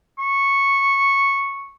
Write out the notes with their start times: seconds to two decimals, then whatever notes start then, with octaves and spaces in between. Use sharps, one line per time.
0.18 C#6